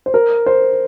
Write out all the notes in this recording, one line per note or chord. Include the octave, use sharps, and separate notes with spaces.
C5
A#4
C5